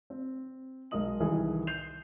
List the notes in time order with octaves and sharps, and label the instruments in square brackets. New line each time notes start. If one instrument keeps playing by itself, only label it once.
[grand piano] C4
B1 G#3 A#4 D#5 D#6 F#7
C2 D#3 E3 G#4
G6 C7 F7